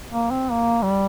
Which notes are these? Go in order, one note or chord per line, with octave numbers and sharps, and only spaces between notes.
A#3
C4
A#3
G3